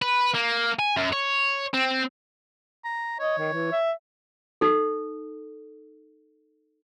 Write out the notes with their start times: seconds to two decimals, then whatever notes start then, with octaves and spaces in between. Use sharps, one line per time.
0.02 B4
0.35 A#3
0.79 G#5
0.97 F#2
1.12 C#5
1.74 C4
2.85 A#5
3.19 C#5 D#5
3.38 D#3
3.53 E3
3.72 E5
4.61 D#4 A4